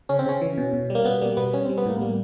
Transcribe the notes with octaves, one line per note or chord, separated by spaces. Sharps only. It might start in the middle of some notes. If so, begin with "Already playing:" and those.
C#3 C#4
C4
C#3 C#4
E3
B2
B2
G3
A#3
B2 B3
G3 A#3
B2 B3
G3 C#4
G3 C4
B3
A2 A#3
B3
G3 A#3